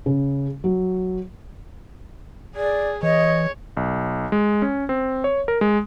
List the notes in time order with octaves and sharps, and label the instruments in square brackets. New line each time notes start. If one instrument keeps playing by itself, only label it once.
[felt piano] C#3
F#3
[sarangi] G#4 [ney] D5
[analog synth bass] E3 [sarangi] C#5 [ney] D#5
[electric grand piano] B1
G#3
C#4
C4
C#5
A#4
G#3